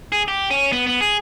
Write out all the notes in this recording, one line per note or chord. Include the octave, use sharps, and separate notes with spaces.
G#4
G4
C#4
B3
B3
G#4